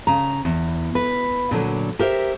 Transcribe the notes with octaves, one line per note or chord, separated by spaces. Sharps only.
C#3 A#5
E2
B4
A#2 D3 D#3 F#3
G4 A#4 C5 E5